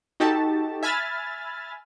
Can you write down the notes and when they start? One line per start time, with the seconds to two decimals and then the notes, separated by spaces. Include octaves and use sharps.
0.20 D#4 F#4 G4 A4 A5
0.83 E5 G#5 B5 F6 A6